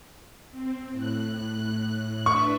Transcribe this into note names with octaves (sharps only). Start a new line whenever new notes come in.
C4
A2 F#6
D4 B4 E5 C#6